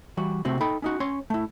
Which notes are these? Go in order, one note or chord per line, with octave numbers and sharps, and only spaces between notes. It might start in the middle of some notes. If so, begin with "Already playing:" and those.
E3 G3 F#4
C3 A3 C4 F#4
D#4 A4 G5 B5
C#4 D#4 F#4
C#4 C#5 C6
A3 E4